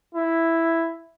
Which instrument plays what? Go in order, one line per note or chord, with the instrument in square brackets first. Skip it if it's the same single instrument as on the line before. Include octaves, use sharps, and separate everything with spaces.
[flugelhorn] E4